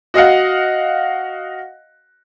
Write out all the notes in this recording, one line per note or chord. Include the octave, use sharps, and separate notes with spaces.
F#4 D#5 F5 F#5